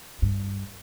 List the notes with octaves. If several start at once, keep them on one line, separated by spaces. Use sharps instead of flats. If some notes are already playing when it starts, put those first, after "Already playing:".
G2